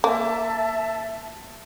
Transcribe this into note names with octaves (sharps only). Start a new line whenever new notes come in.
A#3 E5 A5